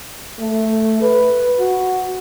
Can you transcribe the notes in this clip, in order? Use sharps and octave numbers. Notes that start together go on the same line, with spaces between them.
A3
B4
F#4